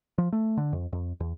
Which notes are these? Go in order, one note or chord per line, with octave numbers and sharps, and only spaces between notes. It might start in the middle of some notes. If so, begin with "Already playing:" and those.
F3
A3
D3
F2
F2
E2